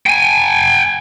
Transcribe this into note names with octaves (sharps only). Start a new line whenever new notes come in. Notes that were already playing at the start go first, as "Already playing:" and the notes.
G5 G#5